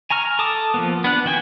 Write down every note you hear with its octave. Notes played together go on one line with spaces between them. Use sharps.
G#5 A#5 C#6 F6
A4 A5 D6 D#6
F3 A#3 B3
B3 D4 F#6
D#3 F#4 G5 G#5